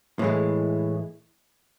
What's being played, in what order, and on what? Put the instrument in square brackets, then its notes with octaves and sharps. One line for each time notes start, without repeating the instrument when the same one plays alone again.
[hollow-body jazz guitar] A2 E3 G#3